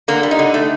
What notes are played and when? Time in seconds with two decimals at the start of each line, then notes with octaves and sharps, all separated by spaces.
0.08 D3 A#3
0.23 G3
0.31 D#4
0.39 D3
0.54 A3